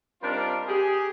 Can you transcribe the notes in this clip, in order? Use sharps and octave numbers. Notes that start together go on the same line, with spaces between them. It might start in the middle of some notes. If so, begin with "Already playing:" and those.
G3 C4 D4 D#4 F4 A#4
G4 G#4